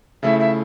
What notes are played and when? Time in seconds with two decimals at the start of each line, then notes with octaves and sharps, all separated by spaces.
0.23 C#3 F3 A3 E4 E5
0.40 E5